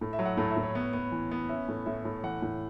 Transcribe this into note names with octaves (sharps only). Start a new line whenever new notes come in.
A2
E5
F#3
F#5
A2 A5
E5
A2
C#5
B3
B3
E3
B3
C#4 E5
A2
A2 E5
A2
E3 F#5
A2